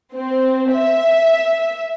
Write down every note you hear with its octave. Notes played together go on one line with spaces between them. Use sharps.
C4
E5